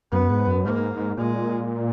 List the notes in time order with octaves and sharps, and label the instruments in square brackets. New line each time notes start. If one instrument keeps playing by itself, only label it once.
[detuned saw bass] F#2 [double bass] B3
[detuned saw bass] G#2
F#2
[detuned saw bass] G#2 [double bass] A#3
[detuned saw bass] A#2 [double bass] G#3